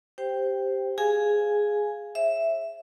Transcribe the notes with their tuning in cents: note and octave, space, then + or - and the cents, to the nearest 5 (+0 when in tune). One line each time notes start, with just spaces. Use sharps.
G4 +0 C5 +0 G5 +0
G#4 +0 F5 +0 G#5 +0
C5 +45 E5 +0